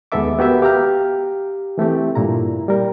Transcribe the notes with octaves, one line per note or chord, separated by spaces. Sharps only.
D#2 G#3 B3 A4 E5 D6
B3 F#4 G4 A#4 B4 E5
G4 F5 G5 A#5 F6
E3 A3 C4 G4
G2 A#2 E4 A#5
G3 A#4